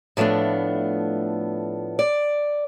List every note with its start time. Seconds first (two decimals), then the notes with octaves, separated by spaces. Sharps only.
0.17 A2 F3 A3 B3 D4
1.99 D5